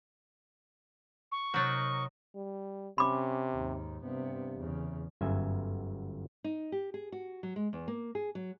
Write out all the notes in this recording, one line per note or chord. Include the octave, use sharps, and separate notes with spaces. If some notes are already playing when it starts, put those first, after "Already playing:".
C#6
C3 F#3 D#4 F#4 A#4 G6 A6
G3
C3 C#4 B5 D6
D#2 G#2
G2 C3 B3
E2 C#3
G1 F#2 E5 G#5
D#4
G4
G#4
F#4
F#3
G#3
E2
A#3
G#4
F#3